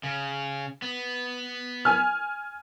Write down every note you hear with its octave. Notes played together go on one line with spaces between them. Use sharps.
C#3
B3
G#5 F6